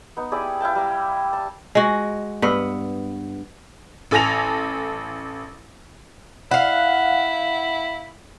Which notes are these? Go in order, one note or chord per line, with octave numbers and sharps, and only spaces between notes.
B3 D#4
E4 G4 G#4 D5
E4 F5 G5 A5
G3 A#5
A5
G#3 F#4
G2 B3
A1 A4 G#5 A#6 F7
E4 F5 F#5